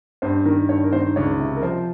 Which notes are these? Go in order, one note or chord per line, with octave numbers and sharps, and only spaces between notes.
G2 C5
D#3 A#4
G2 C#5
A#4
D#3 C5
C#2 C#5
C3
A#4
F3 C5